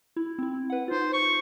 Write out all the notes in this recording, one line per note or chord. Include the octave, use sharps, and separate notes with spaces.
E4
C4 E4
B4 F#5
D#4 F4 C5
C#6